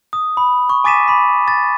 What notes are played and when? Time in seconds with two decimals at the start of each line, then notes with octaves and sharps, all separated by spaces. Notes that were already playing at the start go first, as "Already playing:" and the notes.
0.13 D#6
0.37 B5
0.69 C#6
0.84 G#5 D6 A6 B6 D#7 E7
1.08 B5 D6 B6
1.48 A6